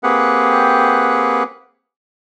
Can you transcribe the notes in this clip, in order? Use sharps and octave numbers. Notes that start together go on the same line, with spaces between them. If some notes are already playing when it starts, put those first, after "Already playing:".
A#3 C4 G4 G#4 B4 F#5